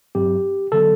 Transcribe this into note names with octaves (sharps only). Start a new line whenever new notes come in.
G2 F#3 C4 G4
D3 F#3 B3 A4